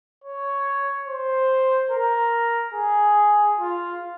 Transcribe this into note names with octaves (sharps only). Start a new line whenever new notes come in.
C#5
C5
A#4
G#4
F4